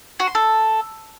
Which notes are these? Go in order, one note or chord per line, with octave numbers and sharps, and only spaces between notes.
F#4
C6
A4